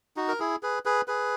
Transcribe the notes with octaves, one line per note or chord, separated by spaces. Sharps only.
D#4 F#4
A#4
E4 G#4
G#4 B4
G#4 B4
G#4 B4